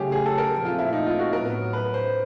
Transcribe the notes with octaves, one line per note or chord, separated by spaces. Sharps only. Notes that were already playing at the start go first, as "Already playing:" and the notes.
Already playing: C#3 F#3 A3 C#4 G4 G#4
G#4
A4
A#4
A#2 F3 A3 C4
F4
E4
D#4
F4
F#4
A2 F#3 B3 A#4
B4
C5